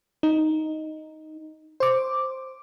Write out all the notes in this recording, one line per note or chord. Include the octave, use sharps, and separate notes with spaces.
D#4
C5 D6